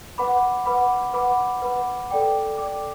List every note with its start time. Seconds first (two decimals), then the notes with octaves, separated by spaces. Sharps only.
0.18 B4 F#5 B5 D6
0.66 B4 F#5 B5 D6
1.14 B4 F#5 B5 D6
1.62 B4 F#5 B5 D6
2.10 A4 D5 G5 D6
2.58 A4 D5 G5 D6